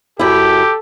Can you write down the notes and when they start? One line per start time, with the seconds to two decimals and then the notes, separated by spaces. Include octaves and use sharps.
0.19 F#2 E4 G4 A4